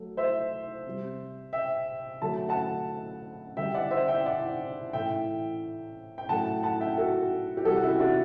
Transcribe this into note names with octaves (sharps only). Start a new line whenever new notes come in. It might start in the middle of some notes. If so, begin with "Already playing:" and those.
Already playing: F#3 A3
C5 E5
C3 G3
E5 G5
D3 F#3 A3 A5
F#5 A5
D3 G3 E5 G5
D5 F#5
C5 E5
E5 G5
D5 F#5
A2 E3 A3 E5 G5
G5
A2 F#3 A3 F#5 A5
F#5 A5
E5 G5
F#4 A4
G4
C3 E3 G3 F#4 A4
F#4
E4 G4
D4 F#4